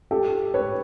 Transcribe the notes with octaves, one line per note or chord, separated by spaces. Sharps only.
G4 A4
B4 C#5